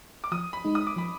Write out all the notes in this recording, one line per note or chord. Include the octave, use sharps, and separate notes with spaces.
D6
F3 D#6
B5
G#3 D#4
D#6
D6
F3 B5